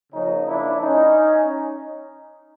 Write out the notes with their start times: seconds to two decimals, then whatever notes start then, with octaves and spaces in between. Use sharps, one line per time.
0.12 C#3 F3 A#3 C#4 D#4
0.47 D4 E4
0.81 C#4 D#4